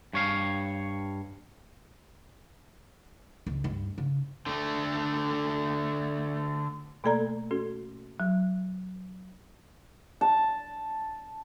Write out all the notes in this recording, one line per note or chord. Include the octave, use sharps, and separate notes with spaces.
G2 C#5 F5
C#2
G2
C#3
D3 A3
B2 A3 A#3 A4 D5 A#5
C#4 F#4 A4
F#3
A5